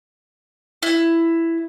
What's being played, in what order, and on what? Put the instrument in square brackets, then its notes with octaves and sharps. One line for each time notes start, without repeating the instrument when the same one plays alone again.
[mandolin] E4